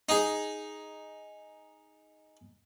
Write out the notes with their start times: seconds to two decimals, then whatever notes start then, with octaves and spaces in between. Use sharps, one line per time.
0.09 D#4 G#4